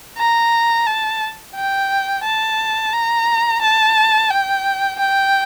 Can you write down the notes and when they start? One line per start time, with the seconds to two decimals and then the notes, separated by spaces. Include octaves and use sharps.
0.18 A#5
0.87 A5
1.55 G5
2.24 A5
2.93 A#5
3.61 A5
4.31 G5
4.99 G5